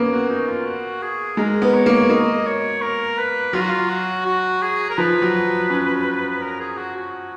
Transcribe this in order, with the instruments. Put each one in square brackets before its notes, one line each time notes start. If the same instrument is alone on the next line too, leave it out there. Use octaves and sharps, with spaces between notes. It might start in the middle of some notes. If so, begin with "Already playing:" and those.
Already playing: [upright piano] A#3 B3 C#4
[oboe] F#4
D#4
F4
F#4
G#4
[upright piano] G#3 [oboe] A#4
[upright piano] B3
[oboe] C#5
[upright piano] A#3
[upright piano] A#3 [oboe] D#5
[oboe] C#5
A#4
B4
[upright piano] F#3 [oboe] F4
[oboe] F#4
F4
F#4
F#4
G#4
A#4
[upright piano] F3 [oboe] B4
[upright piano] F#3
C#4
[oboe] A#4
G#4
F#4
F#4